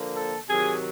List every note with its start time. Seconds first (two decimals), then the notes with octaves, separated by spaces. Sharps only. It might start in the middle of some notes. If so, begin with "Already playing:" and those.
Already playing: D3 F3 A#3
0.14 A4
0.48 C3 D#3 F#3 G#4